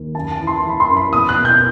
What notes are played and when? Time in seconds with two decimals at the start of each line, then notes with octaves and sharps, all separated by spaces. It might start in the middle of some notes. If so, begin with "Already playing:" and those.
Already playing: D#2
0.15 F#2 A5
0.32 A5
0.40 E3
0.47 C6
0.63 E3
0.69 B5
0.80 C6
0.89 F#2
0.97 B5
1.13 E2 D#6
1.29 F#6
1.37 B2
1.45 G6